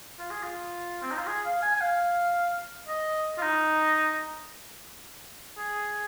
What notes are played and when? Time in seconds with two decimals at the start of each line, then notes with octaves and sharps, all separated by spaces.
0.19 F4
0.31 G#4
0.43 F4
1.02 C4
1.11 D#4
1.18 F4
1.27 G#4
1.45 F5
1.62 G#5
1.75 G#5
1.81 F5
2.88 D#5
3.38 F4
3.42 D#4
5.58 G#4